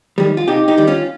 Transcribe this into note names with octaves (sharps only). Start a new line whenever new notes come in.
D#3 G3
F4
C3 D#4 G4
D#4 G4
D#3 G3
C#4 F4